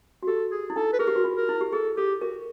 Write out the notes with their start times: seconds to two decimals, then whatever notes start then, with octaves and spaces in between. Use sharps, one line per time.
0.23 F#4
0.27 G4 A4
0.51 G#4
0.70 E4
0.76 D#4 A4
0.93 B4
0.99 G#4 A#4
1.08 G4
1.16 F#4
1.24 F4
1.37 A#4
1.49 E4
1.61 G4
1.73 G#4 A4
1.97 G4 A4
2.21 F#4 A#4